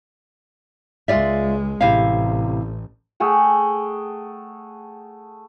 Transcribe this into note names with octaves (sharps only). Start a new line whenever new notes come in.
C#2 G#3 F4 D5 E5
A1 C3 E4 F5
A3 G#4 F#5 G5